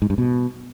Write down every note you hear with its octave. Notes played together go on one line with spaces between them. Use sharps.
G#2
G2
B2